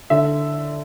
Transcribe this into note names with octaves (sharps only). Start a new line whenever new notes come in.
D3 E5